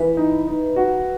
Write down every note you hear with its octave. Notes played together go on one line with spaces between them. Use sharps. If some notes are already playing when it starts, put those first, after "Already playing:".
Already playing: E3 B4 E5
D#4
D#4
F#4